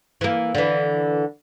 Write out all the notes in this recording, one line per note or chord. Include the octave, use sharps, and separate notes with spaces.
E3 A#3
D3 E3